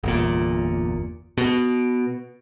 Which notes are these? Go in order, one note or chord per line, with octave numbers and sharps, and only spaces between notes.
G1 E2 A#2
B2